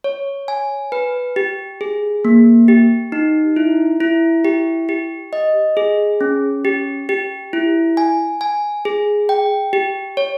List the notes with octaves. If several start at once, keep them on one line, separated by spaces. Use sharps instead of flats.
C#5
G#5
B4
G4
G#4
A#3
G4
D#4
E4
E4
G4
G4
D#5
G#4
C#4
G4
G4
E4
G#5
G#5
G#4
G5
G4
C#5